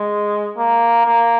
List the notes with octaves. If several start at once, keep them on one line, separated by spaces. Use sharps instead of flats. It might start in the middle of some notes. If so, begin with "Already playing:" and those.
Already playing: G#3
A#3
A#3